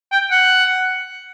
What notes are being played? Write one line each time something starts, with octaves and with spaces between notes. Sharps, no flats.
G5
F#5